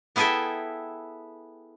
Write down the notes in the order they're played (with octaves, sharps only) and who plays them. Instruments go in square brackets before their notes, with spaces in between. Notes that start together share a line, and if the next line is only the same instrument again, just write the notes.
[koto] B3 E4 G#4 A4 E5 G5